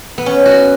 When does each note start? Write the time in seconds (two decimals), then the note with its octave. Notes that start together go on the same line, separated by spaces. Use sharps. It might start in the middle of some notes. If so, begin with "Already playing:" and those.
0.18 B3
0.26 C#4
0.45 F#4